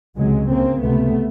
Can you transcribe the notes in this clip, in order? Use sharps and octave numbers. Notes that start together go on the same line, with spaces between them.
C#2 C3 F#3 G#3
D2 C#3 A#3 C4
C#2 C3 A3 B3